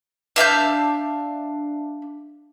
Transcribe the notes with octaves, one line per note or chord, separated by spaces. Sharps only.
D4 E5 F5 G6